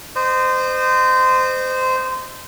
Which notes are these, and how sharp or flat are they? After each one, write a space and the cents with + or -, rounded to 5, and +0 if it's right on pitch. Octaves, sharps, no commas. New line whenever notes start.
C5 -20 D#5 -35